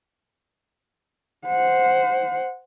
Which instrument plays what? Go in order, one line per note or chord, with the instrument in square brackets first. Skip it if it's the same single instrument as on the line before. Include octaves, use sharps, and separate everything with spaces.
[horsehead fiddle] C5 F#5